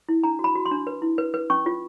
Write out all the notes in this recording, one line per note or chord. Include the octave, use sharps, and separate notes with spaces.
E4
D4 A#5
F#4
B5
F#4
C6
D4
B4
E4
B4
B4
C#4 C#6
F4